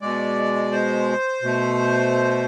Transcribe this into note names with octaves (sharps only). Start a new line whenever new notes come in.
B2 G#3 D5
C5
B2 A3